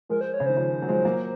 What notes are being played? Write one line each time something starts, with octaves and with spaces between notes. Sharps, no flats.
F3 G#3 A#4
C5
C#5
C#3
D#3 C5
C#3 F3
F#3
F3 G#3
F#3 A#3